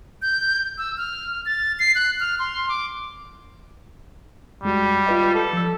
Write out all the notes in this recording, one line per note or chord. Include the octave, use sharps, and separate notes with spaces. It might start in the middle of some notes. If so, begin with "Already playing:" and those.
G6
E6
F6
F6
A6
C7
F#6
F6
C6
D6
F#2 G3 G#3 F#4
F4 B4 D#5
A4
F3 E6